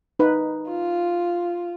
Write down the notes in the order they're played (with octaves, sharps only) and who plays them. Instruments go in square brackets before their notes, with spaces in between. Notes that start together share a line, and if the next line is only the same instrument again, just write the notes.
[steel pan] D#4 B4
[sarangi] F4